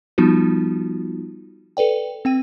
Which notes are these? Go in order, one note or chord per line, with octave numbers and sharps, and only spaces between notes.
F3 G3 B3 D#4 F4 F#4
A4 B4 D5 G5
C4 G5 D#7